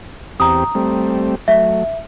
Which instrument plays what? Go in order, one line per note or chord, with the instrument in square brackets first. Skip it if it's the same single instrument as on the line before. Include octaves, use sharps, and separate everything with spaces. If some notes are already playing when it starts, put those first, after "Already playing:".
[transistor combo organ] E2 C4 G4 [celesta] A#5 D#6
[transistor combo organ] G3 A3 C4
[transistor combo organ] F#3 A3 [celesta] E5